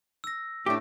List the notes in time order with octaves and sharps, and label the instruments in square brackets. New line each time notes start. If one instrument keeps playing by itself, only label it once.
[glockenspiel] E6 A#6
[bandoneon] A2 A3 [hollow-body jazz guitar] D4 G4 [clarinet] D6